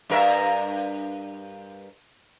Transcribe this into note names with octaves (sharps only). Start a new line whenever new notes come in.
G2 A#4 E5